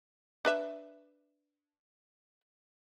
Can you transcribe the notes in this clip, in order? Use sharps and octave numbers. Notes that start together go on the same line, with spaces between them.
D4 B4 E5